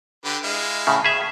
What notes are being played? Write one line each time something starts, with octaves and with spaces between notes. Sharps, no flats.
D3 G4 B4
G#3 E4 F5
A2 C#3
G#4 E5